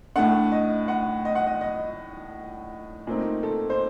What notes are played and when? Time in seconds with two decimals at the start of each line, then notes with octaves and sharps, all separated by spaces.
0.16 A2 A3 D4 F#5
0.52 D#5
0.88 F#5
1.25 D#5
1.35 F#5
1.46 D#5
1.61 D#5
3.07 A#2 A3 C4 D#4
3.43 A4
3.70 C5